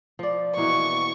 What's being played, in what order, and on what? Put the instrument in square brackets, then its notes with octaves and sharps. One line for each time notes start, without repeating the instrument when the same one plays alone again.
[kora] F3 D5
[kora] B2 E3 A#3 [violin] C#6